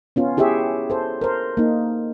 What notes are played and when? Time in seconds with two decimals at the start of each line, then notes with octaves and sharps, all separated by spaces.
0.16 B3 C#4 F4
0.37 E4 G4 G#4 C#5 E5
0.90 A4 C5
1.22 A#4 C5
1.57 A#3 D#4